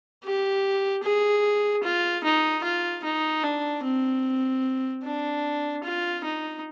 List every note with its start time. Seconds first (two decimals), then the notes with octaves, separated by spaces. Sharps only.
0.24 G4
1.03 G#4
1.84 F4
2.24 D#4
2.63 F4
3.04 D#4
3.44 D4
3.84 C4
5.04 D4
5.83 F4
6.24 D#4